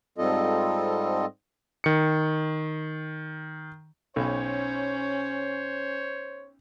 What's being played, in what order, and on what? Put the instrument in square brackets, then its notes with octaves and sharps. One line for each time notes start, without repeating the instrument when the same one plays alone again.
[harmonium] G#2 G3 C4 F4 A4 D#5
[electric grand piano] D#3 C#7
[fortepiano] B1 [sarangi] C#4 [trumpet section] C5 C#5